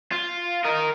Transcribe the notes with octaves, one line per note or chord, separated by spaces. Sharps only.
F4
A#4 D#5